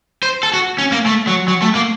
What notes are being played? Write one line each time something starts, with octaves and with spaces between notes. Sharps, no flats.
C5
A4
F#4
C#4
A#3
A3
F#3
F#3
A3
A#3